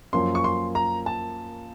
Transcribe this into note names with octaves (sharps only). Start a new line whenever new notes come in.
F#2 F3 A#3 C#4 C6
C#6
C6
A#5
A5